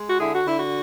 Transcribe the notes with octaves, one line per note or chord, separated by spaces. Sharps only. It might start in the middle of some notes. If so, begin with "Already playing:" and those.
Already playing: G#3
F#4
D3 E4 G#4
F#4
D3 E4
F#4